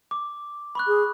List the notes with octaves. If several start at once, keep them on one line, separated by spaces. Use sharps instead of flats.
D6
B5 C#6 F#6
G#4